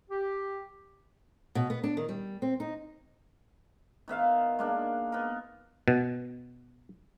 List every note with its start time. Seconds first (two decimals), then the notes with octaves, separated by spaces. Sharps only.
0.10 G4
1.55 B2
1.70 B3
1.84 D4
1.97 D#3
2.09 G3
2.42 C4
2.60 D#4
4.08 D#3 B3 E5 F5
4.59 G#3 A#3 D4
5.12 B3 D#4 A#4
5.88 B2